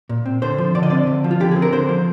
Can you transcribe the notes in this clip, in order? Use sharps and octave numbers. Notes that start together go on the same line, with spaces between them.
A#2
C4
D3 C5
F3
D3 D5
D#5
C4 D5
D3
F3
F4
D3 G4
C4 G#4
A#4
D3 C5
F3